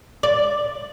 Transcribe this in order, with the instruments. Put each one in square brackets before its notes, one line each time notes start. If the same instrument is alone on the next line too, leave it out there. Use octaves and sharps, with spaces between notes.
[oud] D5